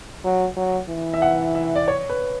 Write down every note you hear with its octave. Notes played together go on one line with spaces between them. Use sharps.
F#3
F#3
E3
E5
F#5
E5
D5
C#5
B4